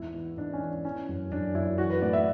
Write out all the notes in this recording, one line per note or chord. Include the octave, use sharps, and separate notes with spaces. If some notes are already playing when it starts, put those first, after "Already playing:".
Already playing: E2 G#2 E4
E3
G#2 D4
C#4
E3
E3 C#4
F#2
F#2 D4
F#2 E4
E3 F#4
B4
A2 D5
E5